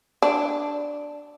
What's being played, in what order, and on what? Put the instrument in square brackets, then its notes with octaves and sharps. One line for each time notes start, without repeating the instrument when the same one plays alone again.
[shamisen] D4